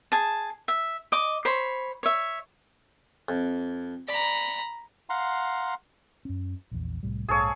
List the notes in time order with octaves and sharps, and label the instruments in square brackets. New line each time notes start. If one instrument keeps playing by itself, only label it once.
[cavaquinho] G#4 A5
E5
D#5 D6
C5 C#5 B5
C#5 E5
[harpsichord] F2
[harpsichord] D5 [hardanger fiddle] A#5 B5
[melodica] F5 F#5 A#5 C6
[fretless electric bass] F#2 C#4
A#1 E2
C2 A2 G3
[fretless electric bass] A#1 G#2 [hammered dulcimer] G#4 A4 C#5